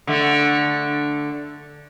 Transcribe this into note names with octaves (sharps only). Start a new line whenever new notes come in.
D3 A3